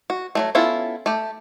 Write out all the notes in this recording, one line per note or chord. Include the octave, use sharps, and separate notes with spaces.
F#4
F#3 G#3 A3
B3 C#4 E4 F4 A4
A3 G4